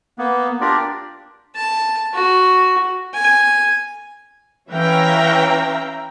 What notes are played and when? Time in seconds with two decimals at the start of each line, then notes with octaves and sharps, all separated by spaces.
0.18 A#3 B3
0.61 D4 F4 G4 A#4 D5
1.55 A5
2.13 F#4
3.14 G#5
4.70 E3 C#4 E5 F5 G5 A#5